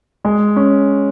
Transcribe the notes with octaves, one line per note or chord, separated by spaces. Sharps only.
G#3
C#4